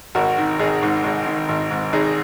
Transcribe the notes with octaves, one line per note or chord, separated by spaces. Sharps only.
G#1 F#4 A#4
D#3
G#1 D#4 G#4
G#2
G#1
D#3
G#1
G#2
G#1 D#4 G#4